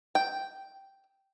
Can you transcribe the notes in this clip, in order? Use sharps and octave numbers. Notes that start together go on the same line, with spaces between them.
G5